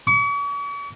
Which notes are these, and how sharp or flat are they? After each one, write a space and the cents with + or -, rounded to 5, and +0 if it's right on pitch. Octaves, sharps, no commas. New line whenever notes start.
C#6 +45